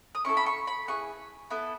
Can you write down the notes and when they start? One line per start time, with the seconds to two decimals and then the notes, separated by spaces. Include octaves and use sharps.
0.15 D#6
0.25 C#4 E4 A4 C#6
0.37 B5
0.46 C#6
0.67 B5
0.88 B3 E4 G#4 C#6
1.50 B3 E4 A4